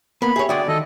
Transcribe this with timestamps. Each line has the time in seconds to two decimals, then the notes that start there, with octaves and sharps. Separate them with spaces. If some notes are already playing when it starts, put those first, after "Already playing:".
0.22 A#3 B3 B5
0.36 G4 G#4 C#5 E5
0.49 D3 G#3 F#4 D5 E5 G5 D#6
0.68 D#3 A4 D#5